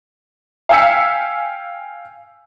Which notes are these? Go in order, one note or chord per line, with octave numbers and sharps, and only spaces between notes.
F5 G5 G#5 E6 B6 C#7